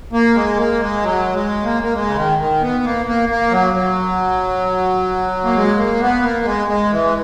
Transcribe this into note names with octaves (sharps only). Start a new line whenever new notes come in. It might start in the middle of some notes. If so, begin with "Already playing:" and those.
A#3
G#3
A#3
G#3
F#3
G#3
A#3
A#3
G#3
C#3
D#3
D#3
B3
A#3
A#3
A#3
F#3
F#3
A#3
G#3
A#3
B3
A#3
G#3
G#3
E3
G#3